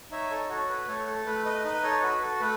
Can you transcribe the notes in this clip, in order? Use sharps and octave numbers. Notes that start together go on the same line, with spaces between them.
D#4 C#5 E5
A4 C#5
F#4 A4 C#5
B4
A3 A4 C#5
A4
A3 B4
B4 D#5
D#4 B4 D#5
A4 C#5
F#4 B4
A4
A3 B4